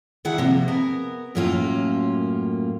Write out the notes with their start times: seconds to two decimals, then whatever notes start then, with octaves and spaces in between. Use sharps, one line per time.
0.25 D3 D#3 E4 G#4 F#5
0.38 C3 F3 G3 A#3
0.68 B3 G#4 A#4
1.35 F#2 A2 F#3 A#3 C#4 F4